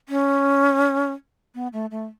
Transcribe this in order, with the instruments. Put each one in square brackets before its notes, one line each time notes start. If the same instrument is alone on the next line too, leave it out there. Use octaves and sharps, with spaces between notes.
[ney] C#4
B3
A3
A3